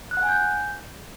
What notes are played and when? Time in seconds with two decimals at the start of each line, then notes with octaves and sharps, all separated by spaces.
0.11 F#6
0.17 F#5
0.23 G#5
0.29 G6